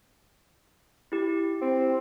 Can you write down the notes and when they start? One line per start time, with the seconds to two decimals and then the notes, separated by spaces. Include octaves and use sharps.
1.12 E4 G4
1.61 C4